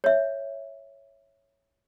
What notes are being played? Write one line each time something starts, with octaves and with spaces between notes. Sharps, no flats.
C#5 E5